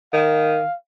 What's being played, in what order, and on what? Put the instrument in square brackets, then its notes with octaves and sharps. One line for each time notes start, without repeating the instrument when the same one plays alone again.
[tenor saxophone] D#3 [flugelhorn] F5